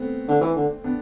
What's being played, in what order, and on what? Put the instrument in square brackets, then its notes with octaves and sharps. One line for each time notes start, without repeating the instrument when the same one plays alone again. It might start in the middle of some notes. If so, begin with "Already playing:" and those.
Already playing: [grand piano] A3 B3 C4
[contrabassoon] D3
E3
D3
[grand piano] B3 D4